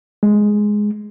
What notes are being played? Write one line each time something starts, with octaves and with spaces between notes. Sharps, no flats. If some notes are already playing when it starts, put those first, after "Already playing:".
G#3